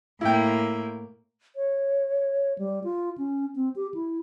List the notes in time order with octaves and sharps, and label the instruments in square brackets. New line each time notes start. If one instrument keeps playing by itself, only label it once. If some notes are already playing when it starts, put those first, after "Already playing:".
[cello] A2 A#3 [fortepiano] E4 G5
[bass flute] C#5
G3
F4
C#4
C4
G4
E4